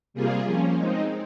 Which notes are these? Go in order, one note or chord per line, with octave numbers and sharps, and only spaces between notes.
C3 G3 A#3 F4 G#4
F3 A#3 C#4
G#3 C4 D#4